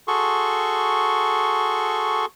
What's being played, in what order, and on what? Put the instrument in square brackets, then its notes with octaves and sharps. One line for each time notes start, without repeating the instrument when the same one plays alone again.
[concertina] F#4 G#4 A4 C6 C#6